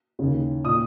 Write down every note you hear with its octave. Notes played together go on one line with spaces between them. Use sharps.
D#2 C#3
A#2 D#6